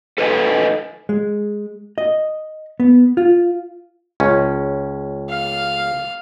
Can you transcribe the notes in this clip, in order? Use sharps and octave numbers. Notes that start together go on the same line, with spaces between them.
A4 B4 C#5 D#5 G#5
G#3
D#5
B3
F4
C#2 C#4
F5